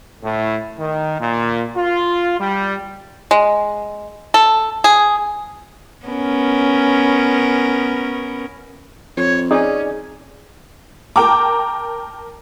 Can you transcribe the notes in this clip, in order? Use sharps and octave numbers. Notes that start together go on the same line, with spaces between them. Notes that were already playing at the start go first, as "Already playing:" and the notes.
A2
D#3
A#2
F4
G3
G#3
A4
G#4
B3 C#4 A#4
F2 C#5
C#4 D#4 G#4 D5
A#4 G5 A5 A#5 D6